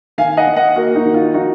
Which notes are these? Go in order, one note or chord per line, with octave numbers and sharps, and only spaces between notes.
D#3 F5 G#5
D#5 F#5
D#3
D#5 F#5
A#3 F#4 A#4
D#4 F#4
D#3
F4
F3 D#4 F#4